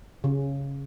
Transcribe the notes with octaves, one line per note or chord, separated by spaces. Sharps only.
C#3